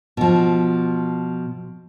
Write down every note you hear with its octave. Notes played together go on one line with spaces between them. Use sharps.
B2 F3